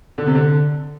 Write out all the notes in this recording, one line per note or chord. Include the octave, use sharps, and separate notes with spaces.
D3
C3
D3